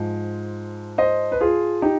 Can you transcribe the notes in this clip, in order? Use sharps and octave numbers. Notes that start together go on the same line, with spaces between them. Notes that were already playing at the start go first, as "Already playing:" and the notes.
Already playing: G#2 F3
C5 D#5
B4
F4 G#4
D#4 G4